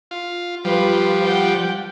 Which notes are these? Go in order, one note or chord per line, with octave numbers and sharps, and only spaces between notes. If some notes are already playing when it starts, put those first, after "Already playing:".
F4
F3 G3 F4 B4
F#5 G5